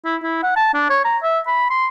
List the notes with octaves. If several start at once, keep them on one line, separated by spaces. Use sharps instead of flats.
E4
E4
F#5
A5
D4
C#5
A#5
E5
B5
C6